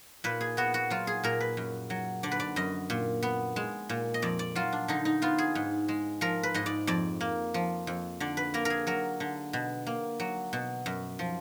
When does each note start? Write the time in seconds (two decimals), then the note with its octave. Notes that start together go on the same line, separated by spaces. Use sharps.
0.24 A#2 B4
0.41 G#4
0.57 B3 F#4
0.74 F#4
0.90 F#3 F4
1.07 G#4
1.24 A#2 A#4
1.40 B4
1.57 F#2
1.90 F#3
2.23 D3 D5
2.31 B4
2.40 D5
2.56 F#2 D#5
2.90 A#2
3.23 B3
3.56 G#3
3.89 A#2
4.14 D#5
4.22 F2 D5
4.39 D5
4.55 F#3 F4
4.72 D4
4.88 D3 D#4
5.05 D#4
5.22 B3 F4
5.38 G#4
5.55 G#2
5.88 G#3
6.21 F3 A#4
6.43 B4
6.54 G#2 D#5
6.66 D5
6.87 F2 D5
7.21 A#3
7.54 F3
7.87 F2
8.20 D3 D5
8.37 B4
8.54 A#3 A#4
8.65 G#4 A#4
8.87 F#3 A#4
9.20 D3
9.53 B2
9.87 A#3
10.20 F#3
10.53 B2
10.86 F#2
11.19 F3